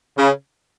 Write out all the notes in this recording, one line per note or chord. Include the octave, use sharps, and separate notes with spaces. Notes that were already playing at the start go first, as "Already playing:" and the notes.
C#3